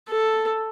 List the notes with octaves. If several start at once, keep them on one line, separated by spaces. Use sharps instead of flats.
A4